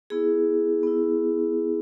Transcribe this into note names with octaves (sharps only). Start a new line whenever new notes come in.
B3 E4 G#4
B3 E4